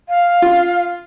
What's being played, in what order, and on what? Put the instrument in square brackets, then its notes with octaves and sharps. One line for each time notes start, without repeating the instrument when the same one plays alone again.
[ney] F5
[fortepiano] F4